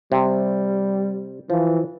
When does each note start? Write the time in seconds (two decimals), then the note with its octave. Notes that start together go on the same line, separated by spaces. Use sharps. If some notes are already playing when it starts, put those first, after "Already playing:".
0.12 C3 G3
1.50 E3 F3